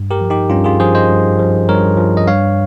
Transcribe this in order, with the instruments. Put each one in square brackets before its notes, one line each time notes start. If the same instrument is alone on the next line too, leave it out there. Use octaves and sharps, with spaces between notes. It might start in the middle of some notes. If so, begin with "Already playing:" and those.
Already playing: [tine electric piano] G2
G4 A#4
F3
D#4 G4
G2 C#4 F4
F4 G#4
F3 G#4 C5
C5 D#5
G2
F3
G2 A#4 C#5
F3
D#5
G2 C#5 F5